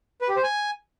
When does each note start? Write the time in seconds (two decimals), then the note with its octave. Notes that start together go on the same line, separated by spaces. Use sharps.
0.21 B4
0.29 G4
0.36 C5
0.43 G#5